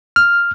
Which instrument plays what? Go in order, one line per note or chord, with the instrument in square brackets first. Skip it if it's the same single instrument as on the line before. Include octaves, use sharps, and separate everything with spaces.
[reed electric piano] F6